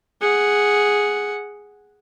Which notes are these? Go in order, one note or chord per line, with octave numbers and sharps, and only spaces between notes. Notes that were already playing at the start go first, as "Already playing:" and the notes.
G#4 F#5